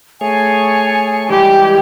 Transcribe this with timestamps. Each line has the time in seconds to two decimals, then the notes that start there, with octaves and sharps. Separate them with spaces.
0.21 A3 G#4 C#5 G#5
1.30 E3 G3 G#3 G4